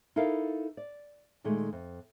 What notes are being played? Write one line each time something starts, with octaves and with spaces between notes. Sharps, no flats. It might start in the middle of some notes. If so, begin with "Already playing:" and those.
D#4 E4 A4 A#4 F5
D5
A#2 D#3 G#3 A3
F2